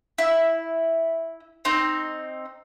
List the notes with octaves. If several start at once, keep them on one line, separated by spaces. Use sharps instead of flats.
E4
C4 D#4